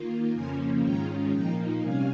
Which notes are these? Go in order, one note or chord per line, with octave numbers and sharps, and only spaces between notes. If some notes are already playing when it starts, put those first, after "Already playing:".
Already playing: D#3 A#3 F4
F2 C#3 F3 A#3 C#4 G#5 C6
G#2 D#3 G#3 C#4 F4 G5 A#5
A#2 F3 A#3 D#4 G5 A#5
C3 G3 C#4 F5 G#5